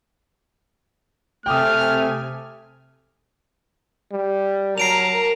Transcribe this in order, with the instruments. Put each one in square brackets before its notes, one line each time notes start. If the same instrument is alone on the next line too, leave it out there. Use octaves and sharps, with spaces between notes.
[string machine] C3 G#5 [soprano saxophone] A3 [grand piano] G5 D6 D#6 [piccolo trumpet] F6
[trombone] G3
[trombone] F#3 [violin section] A#4 [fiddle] A5 A#5 [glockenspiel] C7 D7 F7